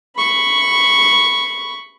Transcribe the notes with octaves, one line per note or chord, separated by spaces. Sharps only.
B5 C#6